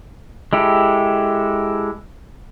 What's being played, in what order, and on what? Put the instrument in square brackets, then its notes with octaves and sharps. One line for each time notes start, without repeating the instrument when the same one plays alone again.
[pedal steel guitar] G#3 E4 G4 A4